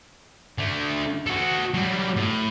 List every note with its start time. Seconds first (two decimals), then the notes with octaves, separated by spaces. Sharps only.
0.58 D3 A3
1.27 F#4 A4
1.74 F#3 G3
2.16 A2